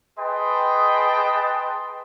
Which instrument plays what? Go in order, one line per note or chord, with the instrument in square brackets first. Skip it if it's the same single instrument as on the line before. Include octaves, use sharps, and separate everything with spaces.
[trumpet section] G#4 B4 D#5 G5 A5 C6